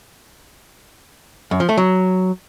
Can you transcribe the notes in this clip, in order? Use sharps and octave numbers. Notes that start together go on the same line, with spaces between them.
F#2
F3
A3
F#3